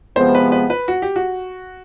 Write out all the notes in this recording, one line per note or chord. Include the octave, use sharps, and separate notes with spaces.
C3 F3 G#3 B3 C5
B4
B4
B4
F#4
G4
F#4